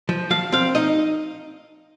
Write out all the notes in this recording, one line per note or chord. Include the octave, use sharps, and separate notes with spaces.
F3
F3 F5
C4 F5
D#4 D#5